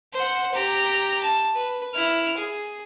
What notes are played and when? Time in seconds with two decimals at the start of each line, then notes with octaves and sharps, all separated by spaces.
0.13 C5 F#5
0.54 G4 A#5
1.23 A5
1.55 B4
1.94 E4 F6
2.37 G#4